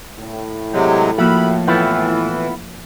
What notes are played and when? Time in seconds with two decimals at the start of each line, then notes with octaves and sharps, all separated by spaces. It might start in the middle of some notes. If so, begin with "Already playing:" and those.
0.19 A2
0.73 C3 F#3 G#3 G4
1.18 F3 A#3 F4 F#4 E5 B5
1.67 E3 B3 E4 F4 G5 A5 F#6